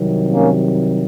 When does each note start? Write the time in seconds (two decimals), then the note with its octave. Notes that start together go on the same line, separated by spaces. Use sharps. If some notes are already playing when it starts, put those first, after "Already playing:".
Already playing: C2 C3 D#3 F#3
0.32 A#3 C#4